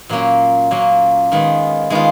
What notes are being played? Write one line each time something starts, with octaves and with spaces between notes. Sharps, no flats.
A#2 F#3 A#3 C#4
A#2 F#3 A#3 C#4
D#3 G#3 B3 F4
D#3 G#3 B3 F4